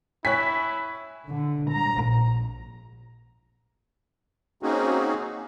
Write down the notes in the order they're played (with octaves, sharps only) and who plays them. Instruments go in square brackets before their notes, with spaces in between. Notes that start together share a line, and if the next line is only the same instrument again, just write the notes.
[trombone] E4 [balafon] C#5 G5 [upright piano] G#5 C#6 F#6 [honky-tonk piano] B6
[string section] D3
A#5
A#1
[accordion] A#3 C4 C#4 D#4 F#4 G#4